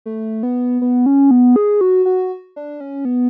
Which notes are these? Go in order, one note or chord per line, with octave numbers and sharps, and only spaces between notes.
A3
B3
B3
C#4
B3
G#4
F#4
F#4
D4
C#4
B3